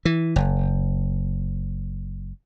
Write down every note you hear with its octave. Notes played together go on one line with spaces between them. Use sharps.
E3
F#1